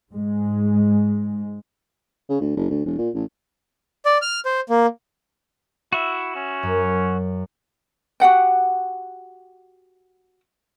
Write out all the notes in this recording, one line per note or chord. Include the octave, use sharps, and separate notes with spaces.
G#2 G#3
C#3
D2
F#1
D2
E1
A#2
A1
D5
F6
C5
A#3
E4 F#4 E5
C#4
F#2
F#4 G4 F#5 G5